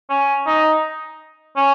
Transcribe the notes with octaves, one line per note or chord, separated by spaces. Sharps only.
C#4
D#4
C#4